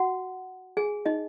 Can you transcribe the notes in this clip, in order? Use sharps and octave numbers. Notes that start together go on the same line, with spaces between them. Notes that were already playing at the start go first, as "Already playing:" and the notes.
Already playing: F#4 F#5
G#4 G#5
D#4 D#5